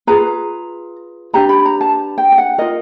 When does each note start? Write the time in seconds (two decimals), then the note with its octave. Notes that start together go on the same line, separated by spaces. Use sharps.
0.07 F4 G#4 B4 A#5
1.33 D4 G4 B4 A#5
1.49 B5
1.65 A#5
1.81 A5
2.18 G5
2.32 G5
2.38 F#5
2.58 F4 A#4 D#5